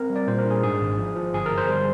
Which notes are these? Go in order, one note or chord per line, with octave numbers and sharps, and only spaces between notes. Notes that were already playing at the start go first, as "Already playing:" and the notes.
Already playing: C4 A#4
G3
D5
A#2 C5
A#4
D4
G#4
G#2 G#4
G#1
F3
F3
G1 G#4
A#4
G1
C5
G3